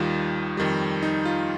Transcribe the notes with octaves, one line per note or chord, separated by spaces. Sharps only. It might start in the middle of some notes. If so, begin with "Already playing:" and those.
Already playing: D#2 D#3 G3 F4
F2 D#3 G3
D#4
F4